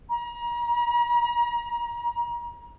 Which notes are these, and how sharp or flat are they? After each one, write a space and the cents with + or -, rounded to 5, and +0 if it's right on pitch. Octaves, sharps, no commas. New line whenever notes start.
A#5 +35